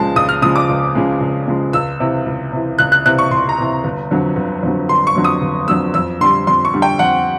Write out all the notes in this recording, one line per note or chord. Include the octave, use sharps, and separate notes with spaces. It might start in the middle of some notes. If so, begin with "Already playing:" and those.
Already playing: C#2 C#3 F3 G#3 A5
C#2 D#6
F6
C#3 F3 G#3 D#6
D6
C#2
C#3 F3 G#3
C#2
C#3 F3 G#3
C#2 E6
C3 E3
C#2
C3 E3
C#2 F#6
F#6
C3 E3 F#6
C#6
C#2 C6
A#5
C3 E3
G1
F2 D3 F#3
G1
F2 D3 F#3
G1 C6
C#6
F2 D3 F#3
D#6
G1
F2 D3 F#3 E6
F2 E6
D3 G3 C6
F2 C6
C#6
D3 G3
G5
F2 F#5